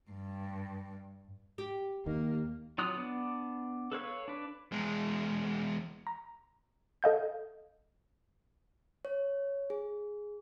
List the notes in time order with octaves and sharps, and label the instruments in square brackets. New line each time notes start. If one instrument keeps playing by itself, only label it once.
[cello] G2
[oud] G4
[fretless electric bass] D#2 D#3 [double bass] A#3
[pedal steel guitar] F#3 F4 D#6 F#6
B3 D4
A4 B4 C#5 F5
D4 B4
[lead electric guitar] E2 G#3
[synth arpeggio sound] A#5
A4 D#5 F5 G6
[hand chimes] C#5
G#4